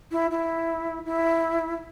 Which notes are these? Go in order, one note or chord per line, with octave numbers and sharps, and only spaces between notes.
E4
E4
E4